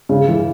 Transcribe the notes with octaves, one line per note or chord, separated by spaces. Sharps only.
C#3
E3